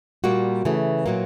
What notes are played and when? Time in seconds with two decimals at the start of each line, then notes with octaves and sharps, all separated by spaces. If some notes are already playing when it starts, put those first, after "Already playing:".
0.24 A#2 G3 A#3 F#4
0.65 C#3 E3 A3
1.06 A#2 F#3 A#3